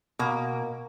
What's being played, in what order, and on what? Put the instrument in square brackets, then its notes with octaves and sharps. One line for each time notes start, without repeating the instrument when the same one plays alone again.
[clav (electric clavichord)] B2 [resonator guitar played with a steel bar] A#3